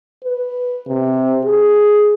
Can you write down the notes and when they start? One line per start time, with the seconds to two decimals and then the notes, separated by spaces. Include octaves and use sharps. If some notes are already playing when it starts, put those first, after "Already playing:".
0.24 B4
0.87 C3
1.45 G#4